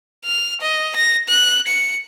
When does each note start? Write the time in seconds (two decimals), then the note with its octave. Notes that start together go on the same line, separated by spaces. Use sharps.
0.25 F6
0.61 D#5
0.96 A#6
1.28 F#6
1.67 C#7